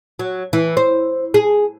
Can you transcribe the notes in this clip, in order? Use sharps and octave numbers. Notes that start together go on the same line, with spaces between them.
F#3
E3
C5
G#4